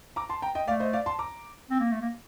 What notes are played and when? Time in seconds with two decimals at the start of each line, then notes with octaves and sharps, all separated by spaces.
0.16 A#5 D6
0.29 A5 C6
0.42 G5 A#5
0.55 D#5 G5
0.68 A3 D5 F5
0.80 C5 D#5
0.93 D5 F5
1.06 A5 C6
1.19 A#5 D6
1.70 C4
1.80 A#3
1.91 A3
2.01 A#3